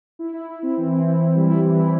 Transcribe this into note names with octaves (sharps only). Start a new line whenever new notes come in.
E4
E4
E4
C4
E3
C4
E4
E4
G3
E4
E3
E4